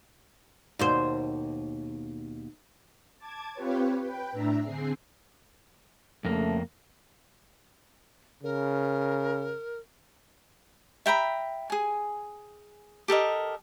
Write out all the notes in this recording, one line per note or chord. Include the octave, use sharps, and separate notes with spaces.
D#2 B2 C5
A5 D6 G#6
C4 F4 G4 B4 C#5
B4 G5
A2 D4 E5 A#5
D3 C4 G#4 C7
F2 C#3 A3 A#3
C#3 A#4
E5 G5 A#5 B5
G#4 G#5
G4 A4 A#4 D#5